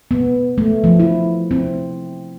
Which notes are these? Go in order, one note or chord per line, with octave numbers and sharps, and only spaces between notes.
B3
A3
F3
E4
C4